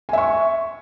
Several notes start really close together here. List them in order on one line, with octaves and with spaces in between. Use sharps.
G#5 E5 C#6